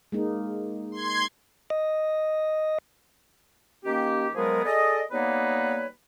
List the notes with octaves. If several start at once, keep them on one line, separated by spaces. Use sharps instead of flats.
G#3 A#3 D#4
C6 G#6
D#5
D#3 A#3 C#4 G4
F3 F#3 G#3 B3 G#4 A#4
G#4 A4 D5 D#5
G3 A#3 B3 D#4 B4 C#5